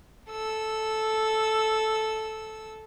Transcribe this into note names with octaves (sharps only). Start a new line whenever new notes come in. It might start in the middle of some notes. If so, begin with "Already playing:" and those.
A4 E6